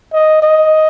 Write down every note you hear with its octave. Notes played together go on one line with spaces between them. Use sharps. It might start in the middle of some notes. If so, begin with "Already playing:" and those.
D#5
D#5